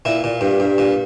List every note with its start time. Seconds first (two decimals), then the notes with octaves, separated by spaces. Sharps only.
0.05 A#2 E4
0.24 A#2
0.41 G2
0.60 G2
0.78 A#2